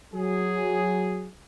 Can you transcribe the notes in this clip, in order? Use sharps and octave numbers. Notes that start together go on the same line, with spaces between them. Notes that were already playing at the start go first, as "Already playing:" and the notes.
F#3 G#4